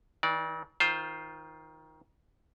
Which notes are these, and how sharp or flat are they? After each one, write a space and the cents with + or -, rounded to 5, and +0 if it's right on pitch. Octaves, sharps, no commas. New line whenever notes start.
E3 -45 D#4 +0 D5 -10
D#3 +20 F4 +0 C5 +0